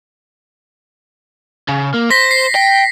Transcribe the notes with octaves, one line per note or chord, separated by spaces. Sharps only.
C#3
A#3
C5 A#6 B6
C7
G5